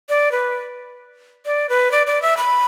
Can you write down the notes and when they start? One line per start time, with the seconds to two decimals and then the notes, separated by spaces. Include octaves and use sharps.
0.09 D5
0.32 B4
1.46 D5
1.69 B4
1.92 D5
2.07 D5
2.22 E5
2.37 B5